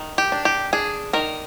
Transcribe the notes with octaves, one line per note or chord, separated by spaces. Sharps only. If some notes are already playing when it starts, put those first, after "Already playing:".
Already playing: D#3
G4
D4
G4
D4 G#4
D#3 A#4